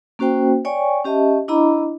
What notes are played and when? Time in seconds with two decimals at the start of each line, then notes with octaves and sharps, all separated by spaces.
0.19 A#3 C#4 F#4 C5 G5
0.65 C#5 D5 G5 G#5 C#6
1.05 C#4 G4 D#5 E5 A5
1.48 D4 E4 D#5 A#5 B5 D6